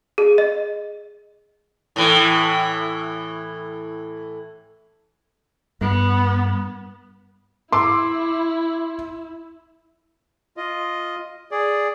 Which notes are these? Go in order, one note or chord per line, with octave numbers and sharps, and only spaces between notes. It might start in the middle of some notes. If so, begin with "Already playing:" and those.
G#4
D#5
A2 E3
G2 B3
E4 C6 D6 E6
F4 D#5
G#4 D5